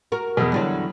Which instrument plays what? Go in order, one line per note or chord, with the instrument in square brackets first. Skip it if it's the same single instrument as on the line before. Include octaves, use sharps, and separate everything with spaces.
[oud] F#4 A#4
[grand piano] E2 B2
[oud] E2 D3 F#3 [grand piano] G3